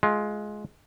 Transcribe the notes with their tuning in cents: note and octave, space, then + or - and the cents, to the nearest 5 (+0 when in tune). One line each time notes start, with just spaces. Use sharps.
G#3 +15 F4 +5